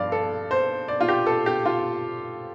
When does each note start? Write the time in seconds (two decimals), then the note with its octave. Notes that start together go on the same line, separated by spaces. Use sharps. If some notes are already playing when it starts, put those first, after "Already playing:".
Already playing: G2 F3 D5 F5
0.12 A4
0.51 C5
0.88 D5
1.01 F4
1.08 G4
1.26 A4
1.46 G4
1.66 F4